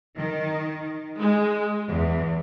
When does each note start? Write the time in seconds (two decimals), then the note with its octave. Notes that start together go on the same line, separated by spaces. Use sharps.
0.17 D#3
1.19 G#3
1.89 E2